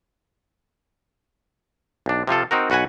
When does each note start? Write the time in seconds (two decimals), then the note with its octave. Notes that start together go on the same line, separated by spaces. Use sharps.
2.06 B1 D4
2.27 C3 F3 F4 A4
2.51 C4 D#4 F#4 A#4
2.70 B1 F#4 B4 F#5 G#5